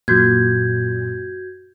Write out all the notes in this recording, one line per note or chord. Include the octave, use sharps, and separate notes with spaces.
F#2 A#2 F#4 G6 G#6